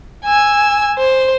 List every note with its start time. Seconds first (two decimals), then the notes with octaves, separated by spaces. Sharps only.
0.25 G#5 E6
0.98 C5